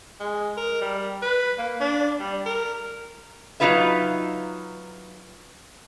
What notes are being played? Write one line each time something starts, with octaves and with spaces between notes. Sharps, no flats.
G#3
A#4
G3
B4
A#3
D4
G3
A#4
F#3 C#4 D#4 F4 B4 E5